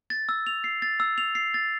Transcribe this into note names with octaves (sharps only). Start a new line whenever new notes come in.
A6
E6
F7
C7
A6
E6
F7
C7
A6